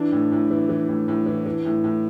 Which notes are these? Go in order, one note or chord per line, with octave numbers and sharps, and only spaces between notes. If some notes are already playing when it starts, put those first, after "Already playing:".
Already playing: E3 D4
A2
A2
E3
E3
A2
A2
E3
E3
A2
A2